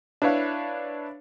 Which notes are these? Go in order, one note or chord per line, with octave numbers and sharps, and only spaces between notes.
D4 E4 B4 C#5 F5